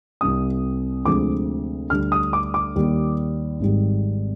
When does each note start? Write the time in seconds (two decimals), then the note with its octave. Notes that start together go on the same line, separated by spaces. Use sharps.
0.21 C2 C3 G3 D#6
1.06 D2 C3 F3 G#3 D6
1.90 D2 D3 G3 F6
2.12 D#6
2.33 D6
2.54 D6
2.76 D#2 D#3 G3
3.60 G#1 G#2 D#3 G3